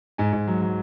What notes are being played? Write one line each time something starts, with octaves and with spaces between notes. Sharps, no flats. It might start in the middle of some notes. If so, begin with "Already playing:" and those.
G#2 G#5
G#2
F#3
F#3